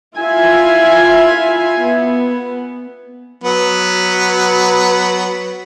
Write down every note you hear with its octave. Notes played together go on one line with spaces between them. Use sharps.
E4 F4 E5 G#5
B3
F#3 B3